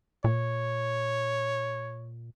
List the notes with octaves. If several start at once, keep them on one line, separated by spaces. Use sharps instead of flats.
A#2 C#5